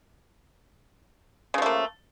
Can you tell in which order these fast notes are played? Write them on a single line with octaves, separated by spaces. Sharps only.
C#3 F3 A3 A#3